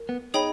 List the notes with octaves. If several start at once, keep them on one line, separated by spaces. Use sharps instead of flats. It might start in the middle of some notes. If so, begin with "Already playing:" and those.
Already playing: A#4
B3
D#4 G#4 C#5 G5 B5